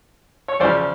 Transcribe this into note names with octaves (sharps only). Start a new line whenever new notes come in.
C#5
E2 C#3 F3 C5 D5